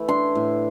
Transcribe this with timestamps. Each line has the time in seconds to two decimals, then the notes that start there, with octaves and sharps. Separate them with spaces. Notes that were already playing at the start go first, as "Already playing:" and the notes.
Already playing: E3 A3 E4
0.08 D4 C6
0.35 A2